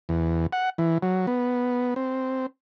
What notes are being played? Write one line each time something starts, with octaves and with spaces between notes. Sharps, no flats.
E2
F#5
E3
F#3
B3
C4